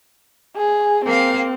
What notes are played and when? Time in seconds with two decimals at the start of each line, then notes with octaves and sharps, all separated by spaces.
0.56 G#4
1.05 A#3 C4 F5